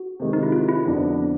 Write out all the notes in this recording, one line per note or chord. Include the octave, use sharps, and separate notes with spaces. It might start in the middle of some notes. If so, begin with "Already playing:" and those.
Already playing: F#4
C3 D#3 G#3
D#4
E4
F4
E4
F2 D3 F#3 B3 D4